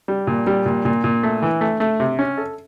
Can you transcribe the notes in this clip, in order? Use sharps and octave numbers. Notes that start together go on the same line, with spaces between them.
G3
A#2
G3
A#2
A#2
A#2
A3
E3
A3
A3
C3
C#4
A4